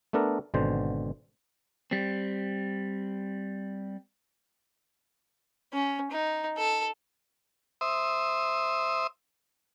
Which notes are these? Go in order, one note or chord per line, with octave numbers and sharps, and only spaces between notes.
A3 B3 D4 A4 A#4
G#1 B2 D3 C5
G3 C4
C#4
D#4
A4
C5 E5 D#6